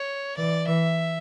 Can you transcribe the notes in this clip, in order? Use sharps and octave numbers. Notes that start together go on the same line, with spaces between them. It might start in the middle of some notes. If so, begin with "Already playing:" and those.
Already playing: C#5
E3 D5
E3 E5